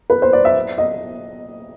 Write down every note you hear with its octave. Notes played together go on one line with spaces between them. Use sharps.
B4
C5
D5
E5
D#5